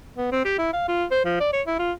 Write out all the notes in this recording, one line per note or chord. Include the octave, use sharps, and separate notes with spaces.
B3
C4
G4
E4
F5
F4
C5
F3
D5
C#5
E4
F4